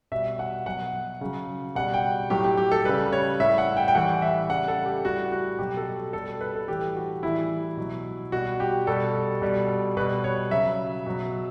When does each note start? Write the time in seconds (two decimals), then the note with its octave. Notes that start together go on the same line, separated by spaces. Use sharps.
0.12 B2 G3 E5
0.39 F#5
0.66 B2 F#3 F#5
1.21 C#3 F#3
1.75 B2 G3 F#5
1.94 G5
2.30 A2 F#3 G4
2.45 G4
2.57 G4
2.72 A4
2.85 C#3 G3 B4
3.13 C#5
3.40 A2 G3 E5
3.58 F#5
3.77 G5
3.88 G5
3.94 A2 E3 G3 F#5
4.22 E5
4.49 C#3 G3 F#5
4.68 A4
4.86 G4
5.04 A2 G3 F#4
5.32 F#4
5.59 B2 F#3 G4
5.77 A4
6.13 B2 G3 A4
6.41 B4
6.55 A4
6.68 A2 E3 G3 G4
6.96 F#4
7.23 A2 E3 G3 E4
7.77 B2 F#3
8.32 B2 G3 F#4
8.60 G4
8.87 B2 G3 A4
9.42 B2 G3
9.97 B2 G3 B4
10.24 C#5
10.51 C#3 F#3 E5
11.06 B2 F#3